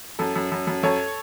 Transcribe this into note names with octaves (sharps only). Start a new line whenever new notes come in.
F#2 A4
F#2
F#2
F#2
F#2 A4 C#5